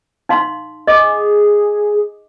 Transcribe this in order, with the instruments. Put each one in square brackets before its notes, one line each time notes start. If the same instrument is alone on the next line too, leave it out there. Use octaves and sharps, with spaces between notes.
[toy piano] D#4 F5 C6
[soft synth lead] G#4 [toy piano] D#5 D6